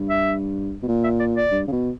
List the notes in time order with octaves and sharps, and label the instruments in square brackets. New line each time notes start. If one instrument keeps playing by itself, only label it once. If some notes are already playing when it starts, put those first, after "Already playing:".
Already playing: [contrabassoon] G2
[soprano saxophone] E5
[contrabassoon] B2
A#2
[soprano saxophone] E5
D5
D5
[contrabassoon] G2
C#3
B2